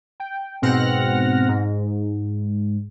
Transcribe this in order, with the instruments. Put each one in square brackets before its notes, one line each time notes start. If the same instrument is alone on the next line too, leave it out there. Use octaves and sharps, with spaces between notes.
[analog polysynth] G5
G#2 B2 C4 F#5 F6 A#6
G#2